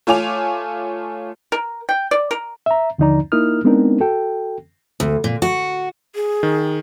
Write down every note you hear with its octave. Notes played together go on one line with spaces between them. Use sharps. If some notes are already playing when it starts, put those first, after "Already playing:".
A3 F4 C#5 G#5 D6 F7
A#4
G5
D5
A#4
E5 A#5
D#2 D3 F3 D#4 D5 A#5
A#3 D#4 E4 A#4 D#6 F6
G#3 B3 C4 D4 D#4 A#4
F#4 A4 G5
D2
A#2
F#4
G#4
D#3